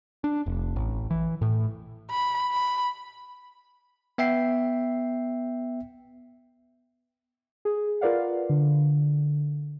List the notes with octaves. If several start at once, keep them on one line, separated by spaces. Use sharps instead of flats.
D4
F1
A1
E3
A2
B5
B5
B3 E5 G5 C7
G#4
F4 A#4 B4 D5 F5 F#5
D3